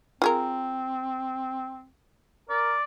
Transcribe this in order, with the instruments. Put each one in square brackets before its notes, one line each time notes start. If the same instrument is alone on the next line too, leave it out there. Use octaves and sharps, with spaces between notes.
[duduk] C4 [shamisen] F4 G#4 A#4
[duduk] A#4 [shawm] D5